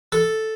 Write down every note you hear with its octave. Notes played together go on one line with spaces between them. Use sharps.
A4